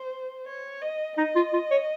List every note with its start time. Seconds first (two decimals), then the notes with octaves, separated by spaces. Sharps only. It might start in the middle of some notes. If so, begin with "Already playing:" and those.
Already playing: C5
0.46 C#5
0.82 D#5
1.17 D#4 D#5
1.36 F4
1.53 F4
1.71 C#5